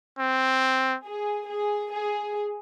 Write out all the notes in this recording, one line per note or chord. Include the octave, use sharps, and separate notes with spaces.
C4
G#4
G#4
G#4